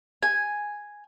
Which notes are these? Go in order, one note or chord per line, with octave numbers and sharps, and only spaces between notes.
G#5